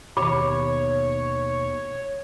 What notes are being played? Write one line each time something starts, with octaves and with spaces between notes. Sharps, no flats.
D#2 B2 G4 C#5 B5 D6